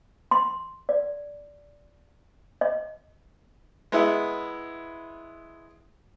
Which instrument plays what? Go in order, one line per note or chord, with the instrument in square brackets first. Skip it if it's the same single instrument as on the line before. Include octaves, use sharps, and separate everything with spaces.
[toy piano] C6
D5
D#5
[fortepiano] G#3 B3 E4